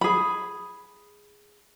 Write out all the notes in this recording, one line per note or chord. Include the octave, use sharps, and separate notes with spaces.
G#4 B5